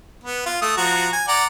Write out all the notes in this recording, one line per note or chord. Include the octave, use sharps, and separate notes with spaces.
B3
F4
A3 D#6
F3 F#4 A#5
G#5
D5 F#5 A#5